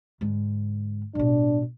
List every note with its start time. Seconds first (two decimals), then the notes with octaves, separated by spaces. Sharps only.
0.21 G#2 D3
1.15 A1 B2 D4